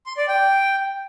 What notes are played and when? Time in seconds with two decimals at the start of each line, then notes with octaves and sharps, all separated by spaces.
0.06 C6
0.17 D5
0.28 G5